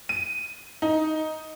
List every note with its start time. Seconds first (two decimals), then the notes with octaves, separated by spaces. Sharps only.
0.09 D#7
0.82 D#4